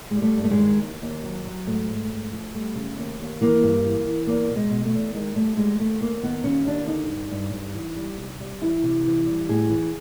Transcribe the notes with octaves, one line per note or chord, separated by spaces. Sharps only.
G3 G#3
A3
G2
A3
G#3
D#3
D#2
D#2
F#3
F#3
G#2 A3
G#2
G#2
F3
G3 A3
C#3
D#2
D#2
E3 A#3
G2
E3
E3
E2 A#3
B2
G#3
B2
A3
E2
D#3 G#3
G3 A3
G3 G#3
D#2 A3
D#2 A#3
D#3 B3
D#2 C#4
D#2 D4
D3 D#4
G2
G2
G2
E3
G3
C3
G3
E3 E4
C3
E3
G3
A2 G#4
E3